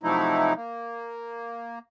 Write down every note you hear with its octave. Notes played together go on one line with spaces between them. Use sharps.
C3 F3 F#3 A3 D#4 E4
A#3